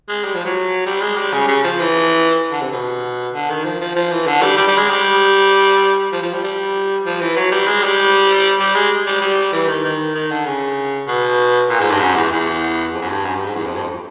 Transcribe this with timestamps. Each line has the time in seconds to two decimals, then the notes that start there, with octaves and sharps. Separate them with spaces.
0.09 G#3
0.24 G3
0.34 F3
0.45 F#3
0.86 G3
1.02 G#3
1.17 G3
1.33 C#3
1.48 C#3
1.64 F3
1.79 E3
2.51 D3
2.62 C3
2.72 B2
3.34 D3
3.50 D#3
3.65 F3
3.80 F3
3.95 F3
4.11 E3
4.27 D3
4.42 G3
4.57 G3
4.68 G3
4.78 G#3
4.89 G3
6.12 F3
6.22 F3
6.33 G3
6.44 G3
7.06 F3
7.21 E3
7.36 F#3
7.51 G3
7.67 G#3
7.83 G3
8.60 G3
8.75 G#3
9.06 G3
9.22 G3
9.53 E3
9.68 D#3
9.84 D#3
10.15 D#3
10.31 D3
10.46 C#3
11.08 B2
11.69 A#2
11.80 G#2
11.90 G2
12.00 F#2
12.16 E2
12.31 E2
12.94 F2
13.01 F#2
13.09 G2
13.25 F#2
13.35 G2
13.45 G#2
13.55 E2
13.66 F2
13.76 G2
13.82 F2